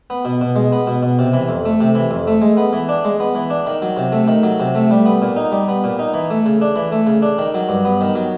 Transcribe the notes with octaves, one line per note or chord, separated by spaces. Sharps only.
B3
B2
B2
G#3
B3
B2
B2
C3
E3
F2
A3
C3
E3
F2
A3
G#3
B3
E3
D4
G#3
B3
E3
D4
D#3
F#3
C3
A3
D#3
F#3
C3
A3
G3
B3
A#2
D#4
G3
B3
A#2
D#4
E3
A3
C#3
D4
E3
A3
C#3
D4
D#3
F#3
G2
B3
D#3
F#3